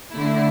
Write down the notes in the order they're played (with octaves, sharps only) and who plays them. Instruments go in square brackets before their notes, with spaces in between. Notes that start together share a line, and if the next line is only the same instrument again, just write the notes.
[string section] D3 A3 E4